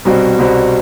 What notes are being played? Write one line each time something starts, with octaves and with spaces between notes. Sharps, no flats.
C2 B2 G3 C4 F#4
C2 B2 G3 C4 F#4